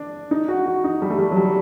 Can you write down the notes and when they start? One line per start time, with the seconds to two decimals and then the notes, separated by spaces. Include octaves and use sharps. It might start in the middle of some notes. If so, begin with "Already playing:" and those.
Already playing: D4
0.31 D#4
0.48 F#4
0.66 F#4
0.84 D#4
1.02 G3
1.10 A3
1.19 G3
1.31 F#3
1.37 G3